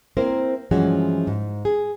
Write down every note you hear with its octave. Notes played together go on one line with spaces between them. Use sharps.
A#3 C4 E4 A#4 C5
G2 E3 F3 G#3 C#4 F#4
G#2
G#4